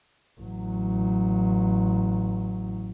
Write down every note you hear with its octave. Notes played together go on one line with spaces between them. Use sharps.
A1 F#3